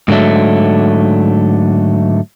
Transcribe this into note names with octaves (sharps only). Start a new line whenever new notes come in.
G#2 D3 F#3 A3